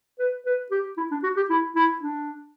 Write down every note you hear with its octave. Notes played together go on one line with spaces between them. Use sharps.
B4
B4
G4
E4
D4
F#4
G4
E4
E4
D4